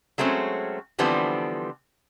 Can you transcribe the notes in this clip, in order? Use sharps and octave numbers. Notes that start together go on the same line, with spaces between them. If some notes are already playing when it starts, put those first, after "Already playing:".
F#3 G#3 A3 C4 C#4
D3 E3 F3 G3 B3 C4